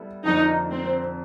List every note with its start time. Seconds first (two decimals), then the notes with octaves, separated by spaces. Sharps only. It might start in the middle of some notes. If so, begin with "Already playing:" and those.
Already playing: G3 B3 E4 A4
0.25 F2 D3 F3 A#3 D4 D#4
0.72 C4